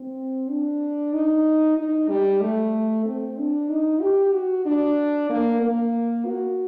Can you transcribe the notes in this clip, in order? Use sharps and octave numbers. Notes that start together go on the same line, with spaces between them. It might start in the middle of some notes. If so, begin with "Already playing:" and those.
Already playing: C4
D4
D#4
D#4
G3
A3
C4
D4
D#4
G4
F#4
D4
A#3
A#3
F#4